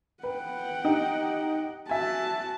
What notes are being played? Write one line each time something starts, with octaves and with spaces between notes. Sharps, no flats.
B4 F#5 G5
D#4 G4
F#4 E5 G#5 A5